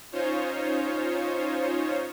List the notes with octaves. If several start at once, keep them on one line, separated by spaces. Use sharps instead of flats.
C#4 D#4 F4 C5 C#5